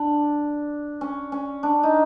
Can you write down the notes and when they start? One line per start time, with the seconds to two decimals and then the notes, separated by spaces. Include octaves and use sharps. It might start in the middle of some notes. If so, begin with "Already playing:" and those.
Already playing: D4
1.01 C#4
1.32 C#4
1.63 D4
1.83 D#4